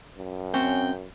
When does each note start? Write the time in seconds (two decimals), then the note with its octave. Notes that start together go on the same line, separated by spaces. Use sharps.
0.17 F#2
0.54 C4 C#4 G5